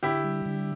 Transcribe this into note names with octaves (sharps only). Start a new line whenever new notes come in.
D3 E4 G4
G3
D3